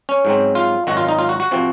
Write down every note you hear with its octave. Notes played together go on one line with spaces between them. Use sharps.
C#4
G#2 F#3 C4
F4
G#1 F#2 D#3 F#4
F4
D#4
F4
F#4
F#4
C3 F3 C4